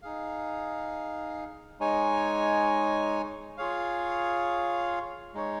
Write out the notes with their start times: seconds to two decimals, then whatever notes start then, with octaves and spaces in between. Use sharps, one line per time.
0.02 D#4 G#4 F5
1.80 G#3 D#4 C#5 G#5
3.57 F4 G#4 C#5 F5
5.34 G#3 D#4 C#5